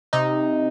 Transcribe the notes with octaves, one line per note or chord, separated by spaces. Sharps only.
C3 D#4